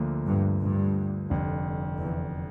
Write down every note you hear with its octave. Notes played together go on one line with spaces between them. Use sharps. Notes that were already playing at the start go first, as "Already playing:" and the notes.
Already playing: D2 D3 F3 A#3
G2
G2
F1 F2 D3
E2